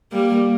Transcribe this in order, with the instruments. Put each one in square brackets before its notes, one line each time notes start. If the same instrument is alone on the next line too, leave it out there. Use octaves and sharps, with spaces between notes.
[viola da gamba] G3 A#3